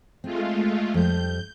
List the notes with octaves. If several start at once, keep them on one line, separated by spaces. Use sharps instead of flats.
G#3 A3 C4 F4
F2 G3 G6